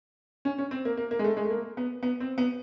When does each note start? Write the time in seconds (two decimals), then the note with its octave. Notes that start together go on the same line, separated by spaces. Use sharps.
0.45 C#4
0.58 C#4
0.71 C4
0.85 A#3
0.97 A#3
1.11 A#3
1.19 G#3
1.24 A3
1.37 G#3
1.45 A3
1.50 A#3
1.77 B3
2.03 B3
2.20 C4
2.38 B3